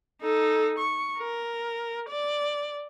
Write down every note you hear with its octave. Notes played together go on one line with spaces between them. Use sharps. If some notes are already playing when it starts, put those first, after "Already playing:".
D#4 A4
C#6
A#4
D5